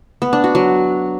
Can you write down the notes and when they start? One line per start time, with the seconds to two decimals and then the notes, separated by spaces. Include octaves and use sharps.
0.22 B3
0.33 D4
0.44 F#4
0.55 F#3